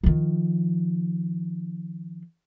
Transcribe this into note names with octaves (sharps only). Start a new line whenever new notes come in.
D#3 F3